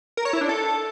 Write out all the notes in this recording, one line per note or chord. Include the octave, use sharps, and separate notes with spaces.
A#4
C#5
E4
D4
A4